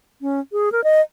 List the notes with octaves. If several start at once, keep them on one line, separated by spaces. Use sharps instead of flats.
C#4
G#4
A#4
D#5